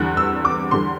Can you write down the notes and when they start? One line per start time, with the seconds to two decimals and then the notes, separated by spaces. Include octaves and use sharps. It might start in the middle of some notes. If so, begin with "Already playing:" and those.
Already playing: E2 D3 G3 F#6
0.17 E6
0.45 D6
0.71 E2 D3 G3 C6